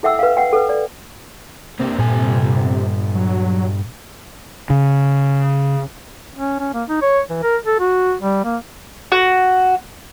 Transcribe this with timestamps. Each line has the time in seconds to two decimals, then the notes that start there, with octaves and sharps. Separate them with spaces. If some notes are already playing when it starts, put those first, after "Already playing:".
0.03 E4 A4 E5 F#5 G5 E6
0.19 B4 F5
0.37 F#5 G5
0.53 A4 B4
0.69 D5
1.79 C3 A#3 C4 D4
1.99 G2 A#2 A4 G#5
3.15 F#3
4.70 C#3
6.36 C#4
6.59 C#4
6.74 A#3
6.89 D#4
7.02 C#5
7.30 E3
7.43 A#4
7.66 A4
7.80 F#4
8.21 G3
8.44 A#3
9.12 F#4